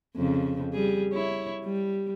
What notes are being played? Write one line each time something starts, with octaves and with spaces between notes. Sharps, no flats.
F2 C#3
G3 G#4
E4 C#5
G3